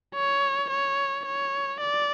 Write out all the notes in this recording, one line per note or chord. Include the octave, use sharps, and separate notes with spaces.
C#5
C#5
C#5
D5